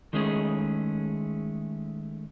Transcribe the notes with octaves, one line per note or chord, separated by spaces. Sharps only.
D#3 G#3 A3 C#4 G#4